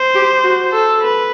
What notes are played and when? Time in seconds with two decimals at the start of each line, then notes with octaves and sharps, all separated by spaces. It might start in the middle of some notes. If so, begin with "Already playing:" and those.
Already playing: C5
0.15 G4
0.44 F#4
0.72 A4
1.02 B4